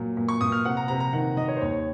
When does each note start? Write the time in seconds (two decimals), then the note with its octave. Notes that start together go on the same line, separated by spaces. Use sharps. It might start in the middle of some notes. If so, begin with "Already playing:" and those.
Already playing: A#2 F#3
0.17 A#2
0.28 C#6
0.41 A#2 D#6
0.52 F6
0.65 C3 F#5
0.77 A#5
0.88 C3 A#5
1.00 A#5
1.13 D#3 F#5
1.37 D#3 D#5
1.48 C#5
1.56 C5
1.61 D#2 C#5